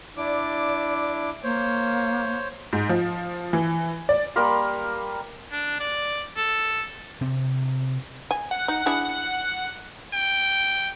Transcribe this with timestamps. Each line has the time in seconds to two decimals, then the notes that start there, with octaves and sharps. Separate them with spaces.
0.17 D4 E4 D5 D6
1.44 A#3 C5 C#5
2.73 G#2
2.89 F3
3.53 E3
4.09 D5
4.36 G3 A#3 A#4 C6
5.52 D4
5.80 D5
6.37 A4
7.21 C3 C4
8.31 G#5
8.51 F#5
8.68 D#4
8.86 D4 E4 G#4
10.13 G5